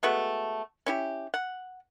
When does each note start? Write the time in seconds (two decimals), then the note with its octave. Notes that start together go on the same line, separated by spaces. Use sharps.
0.03 G#3 A3 B3 F#4
0.86 C#4 E4 G4
1.34 F#5